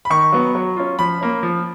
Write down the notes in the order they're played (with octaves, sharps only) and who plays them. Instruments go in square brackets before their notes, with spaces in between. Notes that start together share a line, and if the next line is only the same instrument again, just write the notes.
[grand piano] B5
D#3 C#6
F#3 B3
F#3
C#4 F4
F3 B5
A#3 C#4
F3